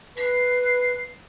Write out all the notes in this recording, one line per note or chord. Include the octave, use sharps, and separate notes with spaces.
B4 C7